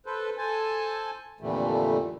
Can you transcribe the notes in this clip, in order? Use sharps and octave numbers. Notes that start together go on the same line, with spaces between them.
A4 B4 C5
A4 C5 G#5 A5
F2 A#2 D3 E3 G3 A3